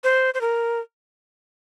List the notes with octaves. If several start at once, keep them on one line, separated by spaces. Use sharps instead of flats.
C5
C5
A#4